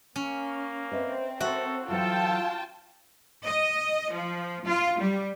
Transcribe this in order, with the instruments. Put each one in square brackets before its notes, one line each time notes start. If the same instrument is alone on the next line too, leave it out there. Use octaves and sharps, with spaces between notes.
[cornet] A#3 [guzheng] C#4
[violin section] C4 [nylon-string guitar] B4 D#5 E5
[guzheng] F#4 [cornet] A4 [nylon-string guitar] A#4 E5
[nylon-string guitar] E3 F#3 C5 [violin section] F4 G5 A5 [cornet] A4
[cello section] D#5
F3
F4
G3